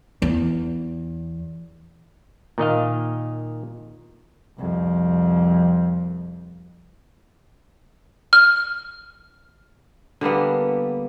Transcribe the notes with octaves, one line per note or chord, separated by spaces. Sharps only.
E2
A#2 D#3 D#5 F5
C2 F2
F6
D3 G3 A#3 B3